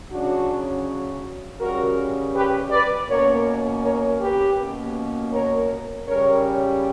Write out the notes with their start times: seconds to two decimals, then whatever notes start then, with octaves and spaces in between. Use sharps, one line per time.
0.10 C#3 F#3 C#4 D4 F#4
1.59 C#3 G3 C#4 F#4 A#4
2.34 G4 B4
2.70 B4 D5
3.08 B2 A#3 C#4 A#4 C#5
3.83 A#4 C#5
4.20 G4 B4
4.57 B2 A#3 C#4
5.32 A#4 C#5
6.05 C#3 G3 C#4 A#4 C#5